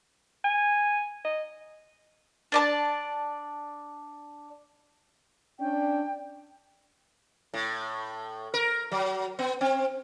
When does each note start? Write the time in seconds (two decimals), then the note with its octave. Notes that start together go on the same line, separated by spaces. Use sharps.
0.44 G#5
1.25 D#5
2.52 D4 D5 A5
5.60 C#4 D4 G5
7.54 A2
8.54 A#4
8.92 F#3
9.39 B3
9.61 C4